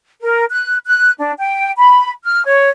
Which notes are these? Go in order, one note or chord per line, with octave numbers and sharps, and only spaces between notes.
A#4
F#6
F#6
D4
G5
B5
F6
C#5